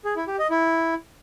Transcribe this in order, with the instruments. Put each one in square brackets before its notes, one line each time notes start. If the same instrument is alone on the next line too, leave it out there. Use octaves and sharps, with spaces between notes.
[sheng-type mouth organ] G#4
E4
G4
D#5
E4